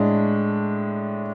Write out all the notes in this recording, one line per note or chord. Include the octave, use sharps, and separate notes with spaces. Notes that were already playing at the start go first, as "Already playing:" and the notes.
Already playing: A2 G#3 D4